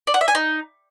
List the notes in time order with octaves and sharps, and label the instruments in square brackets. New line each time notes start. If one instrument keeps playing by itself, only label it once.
[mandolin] D5
F#5
E5
G#5
D#4